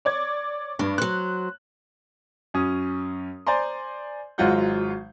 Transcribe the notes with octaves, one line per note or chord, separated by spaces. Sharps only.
C#5 D5 G#6
G2 D4
F#3 C5 F#6
F#2 C#4 D#6
C5 D5 G#5 A#5 C6
G#1 F#3 G#3 F4 F#5 G6